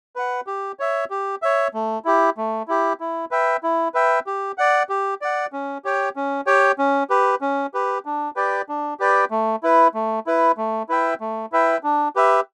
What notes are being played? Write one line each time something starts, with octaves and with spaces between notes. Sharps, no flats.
B4 F#5
G4
C#5 E5
G4
C#5 E5
A3
E4 G4
A3
E4 G4
E4
B4 E5 G5
E4
B4 E5 G5
G4
D5 F#5
G4
D5 F#5
C#4
G4 C#5 G5
C#4
G4 C#5 G5
C#4
G4 B4
C#4
G4 B4
D4
G4 B4 D5 G5
D4
G4 B4 D5 G5
A3
E4 B4
A3
E4 B4
A3
E4 B4 E5 G5
A3
E4 B4 E5 G5
D4
G4 B4 E5